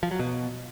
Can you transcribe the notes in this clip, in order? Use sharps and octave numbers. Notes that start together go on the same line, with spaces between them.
F3
F#3
B2